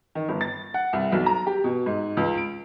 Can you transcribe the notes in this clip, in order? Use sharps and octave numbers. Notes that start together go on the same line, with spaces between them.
D#3
G1
A6
F#5
C2
B1
A#5
G4
B2
G#2
C#2
D7